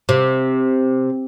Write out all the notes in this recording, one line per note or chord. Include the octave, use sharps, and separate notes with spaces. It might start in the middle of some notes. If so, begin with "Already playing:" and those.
C3